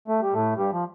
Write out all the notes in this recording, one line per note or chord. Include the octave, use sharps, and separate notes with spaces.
A3
G3
A2 A3
G2 G3
F3